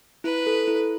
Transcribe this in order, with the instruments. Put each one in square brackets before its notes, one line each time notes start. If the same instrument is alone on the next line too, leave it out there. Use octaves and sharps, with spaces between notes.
[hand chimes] E4 [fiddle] B4
[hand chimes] A4
E4